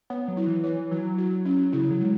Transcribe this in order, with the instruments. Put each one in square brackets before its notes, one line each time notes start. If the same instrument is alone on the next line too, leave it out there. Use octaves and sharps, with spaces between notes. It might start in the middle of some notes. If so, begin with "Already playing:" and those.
[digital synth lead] B3 [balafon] C#5
[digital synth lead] F#3
[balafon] E4
[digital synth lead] E3
[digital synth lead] E3 [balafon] C#5
[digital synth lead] F#3 [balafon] E4
[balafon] F#4
C#4
[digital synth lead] C#3 [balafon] E4
[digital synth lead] F#3
[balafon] G#3